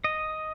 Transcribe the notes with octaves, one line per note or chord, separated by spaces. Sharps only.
D#5